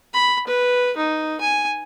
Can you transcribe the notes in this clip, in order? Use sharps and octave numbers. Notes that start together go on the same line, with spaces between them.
B5
B4
D#4
G#5